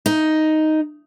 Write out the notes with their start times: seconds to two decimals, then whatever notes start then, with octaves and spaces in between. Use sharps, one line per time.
0.06 D#4